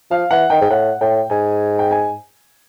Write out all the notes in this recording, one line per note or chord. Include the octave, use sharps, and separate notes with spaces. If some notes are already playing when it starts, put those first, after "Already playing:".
F3 F5
E3 F#5
D#3 G5
G#2
A2 F#5
A2 G5
G#2 G#5
G5
G#5